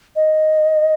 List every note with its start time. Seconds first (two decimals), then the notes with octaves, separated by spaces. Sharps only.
0.16 D#5